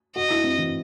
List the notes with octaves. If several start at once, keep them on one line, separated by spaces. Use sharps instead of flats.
F#4 D#5
E4
C4
E3